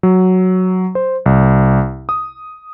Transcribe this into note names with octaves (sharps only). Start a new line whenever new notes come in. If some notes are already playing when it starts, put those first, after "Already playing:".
F#3
C5
C2
D#6